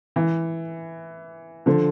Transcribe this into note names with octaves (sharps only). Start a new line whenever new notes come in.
E3
D3 F3